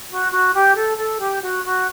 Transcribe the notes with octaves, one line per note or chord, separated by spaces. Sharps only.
F#4
F#4
G4
A4
A4
G4
F#4
F#4